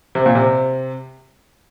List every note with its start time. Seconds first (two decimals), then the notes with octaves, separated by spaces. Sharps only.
0.15 C3
0.26 A#2
0.35 C3